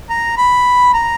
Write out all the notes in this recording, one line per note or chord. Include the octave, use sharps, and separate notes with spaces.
A#5
B5
A#5